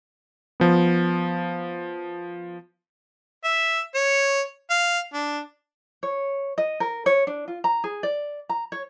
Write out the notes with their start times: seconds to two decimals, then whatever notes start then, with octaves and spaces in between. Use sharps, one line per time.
0.60 F3 B3
3.44 E5
3.94 C#5
4.70 F5
5.13 D4
6.03 C#5
6.58 D#5
6.80 A#4
7.06 C#5
7.27 D4
7.48 F4
7.64 A#5
7.84 G#4
8.03 D5
8.49 A#5
8.72 C#5